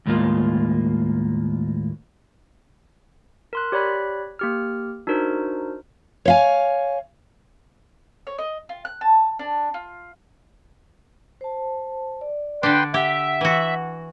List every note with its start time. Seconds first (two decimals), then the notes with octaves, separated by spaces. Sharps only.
0.06 D#2 A2 G#3 A#3 F4
3.53 A#4 C6 F#6
3.72 G4 C#5 D5 B5 F#6 B6
4.39 A#3 G4 F6
5.07 D4 D#4 F#4 A#4 C5
6.25 C#5 F5 G#5
8.27 C#5
8.38 D#5
8.69 F4
8.85 F#6
9.01 A5
9.39 D4
9.74 F4
11.41 C5 A5
12.21 D5
12.63 D3 D4 B4 G5 C6
12.94 G4 E5 F#5
13.41 E3 F#4